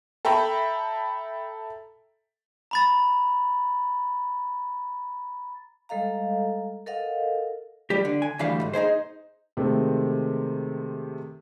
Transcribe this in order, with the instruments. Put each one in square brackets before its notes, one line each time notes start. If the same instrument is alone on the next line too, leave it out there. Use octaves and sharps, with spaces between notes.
[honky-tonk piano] A4 E5 G5 A#5 B5
[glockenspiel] A#5 B5 A6
[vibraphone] G3 G#3 A4 D#5 F5 A#5
A4 A#4 D#5 F5 F#5
[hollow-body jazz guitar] G3 G4
D3
G#5
D2 E3 G3 A3 F5
G#2
D#4 E4 G#4 C5
[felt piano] C3 D#3 G#3 A3 C4